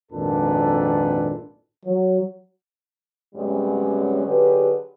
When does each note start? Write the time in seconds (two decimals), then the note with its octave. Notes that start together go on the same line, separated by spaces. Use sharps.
0.11 G#1 F2 A#2 D4 A4 B4
1.85 F#3
3.35 F#2 C3 G3 G#3 B3 C#4
4.25 D3 F#3 G4 G#4 B4